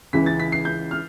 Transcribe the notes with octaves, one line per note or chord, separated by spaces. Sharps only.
C#2 C#3 E3 B6
A6
B6
C7
G6
F6